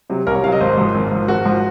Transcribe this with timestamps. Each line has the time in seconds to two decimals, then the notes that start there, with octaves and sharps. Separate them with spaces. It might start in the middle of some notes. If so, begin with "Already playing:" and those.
0.10 C3 F#3
0.27 C2 A#4
0.35 C#5
0.43 C3 F#3 F5
0.52 D#5
0.60 G#1 C5
0.77 G#2 F3
0.94 G#1
1.12 G#2 F3
1.28 G#1 F#4
1.45 G#2 F3